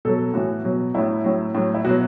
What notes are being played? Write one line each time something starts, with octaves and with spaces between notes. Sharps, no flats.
B2 F#3 A4
A2 E3 F#4
B2 F#3
A2 F#3 E4
A2 F#3
A2 F#3
E4
B2 F#3 F#4